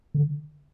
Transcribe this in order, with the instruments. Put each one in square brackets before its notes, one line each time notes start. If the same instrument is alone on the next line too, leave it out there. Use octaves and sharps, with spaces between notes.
[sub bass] D3